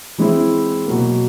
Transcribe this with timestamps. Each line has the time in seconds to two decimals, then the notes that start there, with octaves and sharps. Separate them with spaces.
0.18 E3 G#3 C4 E4
0.86 B2 F#3 A#3